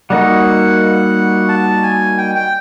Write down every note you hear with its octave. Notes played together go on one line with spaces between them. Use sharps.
G3 A#3 D#4 F#4 F#5
A5
G#5
G5
G5